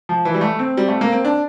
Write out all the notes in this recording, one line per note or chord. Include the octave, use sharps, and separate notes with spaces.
F3
E3
G3
A3
C4
G3
A3
A#3
C4
D4